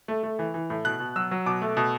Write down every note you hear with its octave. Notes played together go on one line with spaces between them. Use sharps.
A3
A3
E3
E3
A2
B2 F#6
B2
F#3 E6
F#3
B2 D6
A3
B2